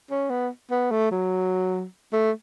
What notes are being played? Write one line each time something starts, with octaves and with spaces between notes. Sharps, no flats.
C#4
B3
B3
A3
F#3
A3